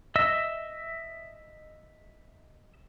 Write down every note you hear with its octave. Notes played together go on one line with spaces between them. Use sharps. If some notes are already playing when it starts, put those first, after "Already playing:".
D#5 E5 E6